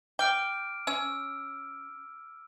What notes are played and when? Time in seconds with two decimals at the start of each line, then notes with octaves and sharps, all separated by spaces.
0.19 G5 D6 F6 D7
0.87 C#4 E6